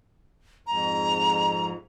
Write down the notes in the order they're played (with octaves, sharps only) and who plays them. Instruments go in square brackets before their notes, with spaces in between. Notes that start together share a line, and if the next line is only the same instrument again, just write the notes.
[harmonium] F2 G#2 [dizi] A#5